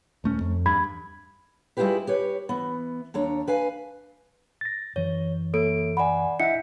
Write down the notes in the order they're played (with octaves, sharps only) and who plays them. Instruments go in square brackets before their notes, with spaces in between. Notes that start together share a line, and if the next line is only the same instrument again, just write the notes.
[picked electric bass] D#1 A3 C#4
F2
[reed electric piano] E2 B5 G#6 [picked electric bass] G2
[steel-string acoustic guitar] G3 G#3 E4 F4 G4 B4
G4 B4 C#5
E3 B3
D#2 D4 C#5 A#5
B4 F5 G#5
[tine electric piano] A6 A#6
[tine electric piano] F#2 E3 [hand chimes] C#5
[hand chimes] A#3 C#5 D7 [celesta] A4
[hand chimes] D5 F#5 [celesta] G#5 B5
[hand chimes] D4 E4 B6 [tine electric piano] D#5 E5 F#5 [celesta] C#7